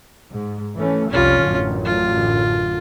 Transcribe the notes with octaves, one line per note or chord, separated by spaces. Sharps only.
G#2
E3 A3 C#4
F1 C2 G3 C#4 F4
A1 F#2 D3
F4